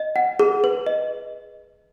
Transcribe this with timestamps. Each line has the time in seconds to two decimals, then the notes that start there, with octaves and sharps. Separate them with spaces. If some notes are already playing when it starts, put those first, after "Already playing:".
Already playing: D#5
0.16 F#5
0.39 G#4
0.64 B4
0.87 D#5